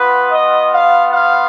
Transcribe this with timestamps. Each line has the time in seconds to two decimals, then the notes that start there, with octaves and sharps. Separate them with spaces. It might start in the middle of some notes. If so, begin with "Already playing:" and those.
Already playing: B3 F4 B4
0.31 D#5
0.72 F5
1.13 F5